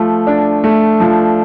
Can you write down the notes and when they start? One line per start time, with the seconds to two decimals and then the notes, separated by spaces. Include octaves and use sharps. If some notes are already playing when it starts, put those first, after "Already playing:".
Already playing: F3 A3
0.27 D4
0.64 A3
1.00 F3